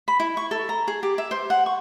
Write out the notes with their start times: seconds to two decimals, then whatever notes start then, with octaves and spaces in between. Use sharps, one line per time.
0.08 B5
0.20 E4
0.37 C#6
0.51 A4
0.69 A#5
0.88 G#4
1.03 G4
1.18 E5
1.31 C5
1.50 F#5
1.66 C#6